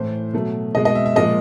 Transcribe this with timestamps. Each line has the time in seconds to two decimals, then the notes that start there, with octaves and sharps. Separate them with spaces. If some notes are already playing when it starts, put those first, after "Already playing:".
Already playing: A2 E3 A3 C5
0.33 B2 F#3 A3
0.75 B2 D#5
0.77 G#3
0.85 D#5
0.95 E5
1.06 E5
1.16 A#2 F3 G#3 D#5